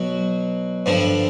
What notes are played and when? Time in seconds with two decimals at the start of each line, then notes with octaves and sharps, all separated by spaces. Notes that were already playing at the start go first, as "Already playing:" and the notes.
Already playing: B2 F#3
0.86 G2 D3 F3